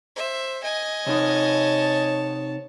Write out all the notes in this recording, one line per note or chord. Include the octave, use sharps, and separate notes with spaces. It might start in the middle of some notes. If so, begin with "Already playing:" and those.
C5 E5
D#5 G#5
C3 D#4 C#5 A5